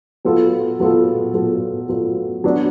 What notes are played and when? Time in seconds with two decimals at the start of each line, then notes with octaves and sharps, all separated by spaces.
0.25 F#3 B3 F4 A4
0.80 F#3 B3 F4 A4
1.34 F#3 B3 F4 A4
1.89 F#3 B3 F4 A4
2.44 F#3 B3 D4 F#4